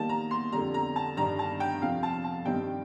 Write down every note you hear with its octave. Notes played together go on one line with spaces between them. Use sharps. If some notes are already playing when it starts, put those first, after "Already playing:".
Already playing: D#3 G3 A#3 A5
A#5
C6
F2 D3 G3 A#5
A#5
A5
G2 D#3 G3 D4 A#5
A5
G5
F2 C3 F3 F5
A5
A5
G2 D#3 G3 C4 D#4 G5